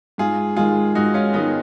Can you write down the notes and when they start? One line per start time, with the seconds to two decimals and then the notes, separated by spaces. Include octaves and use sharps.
0.18 G#2 F4 G#4
0.56 D#3 G#3 F4 G#4
0.95 G#2 D#4 F#4
1.14 C#4 F4
1.33 D#3 G#3 B3 D#4